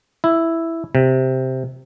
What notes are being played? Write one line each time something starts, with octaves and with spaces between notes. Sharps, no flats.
E4
C3